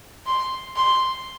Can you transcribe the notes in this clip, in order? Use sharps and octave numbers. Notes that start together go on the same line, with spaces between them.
C6
C6